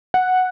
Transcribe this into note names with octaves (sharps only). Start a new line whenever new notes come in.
F#5